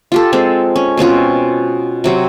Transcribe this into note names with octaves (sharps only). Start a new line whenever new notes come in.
F4 G4 A4
G#3 C4 A4
C#4
B2 C4 C#4 F4
C3 F#3 C4